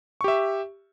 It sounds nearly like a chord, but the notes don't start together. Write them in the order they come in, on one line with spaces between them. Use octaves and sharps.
C#6 G4 E5